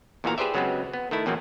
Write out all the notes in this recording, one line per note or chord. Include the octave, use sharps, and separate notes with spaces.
E2 A#2 E3 F#4 F5 A#5
G4 G#4 B4 C5 D5 E5
C#3 F#3 G#3 B3 C4 B4
B3
D#3 A3 E4
E2 A#2 F3 F#3 C4